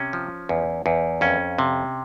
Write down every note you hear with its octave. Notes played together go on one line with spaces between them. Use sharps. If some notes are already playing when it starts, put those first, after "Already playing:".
Already playing: C3 C#4
F3
E2
E2
F2 C#4
C3